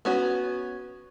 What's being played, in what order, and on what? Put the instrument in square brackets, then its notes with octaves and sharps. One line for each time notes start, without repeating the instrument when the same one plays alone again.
[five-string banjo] B3 C#4 F#4